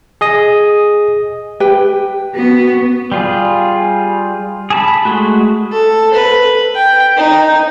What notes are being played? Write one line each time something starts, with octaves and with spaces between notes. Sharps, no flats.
G#4 D#5 D#6
G4 B4 G5
B3 F#4
G3 F4 G#4
G#4 A5 B5
G#3 A3 F#4
A4
B4
G5
D#4